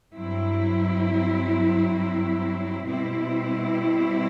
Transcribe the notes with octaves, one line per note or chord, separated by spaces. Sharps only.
G2 F#3 C4 E4
B2 G3 C4 E4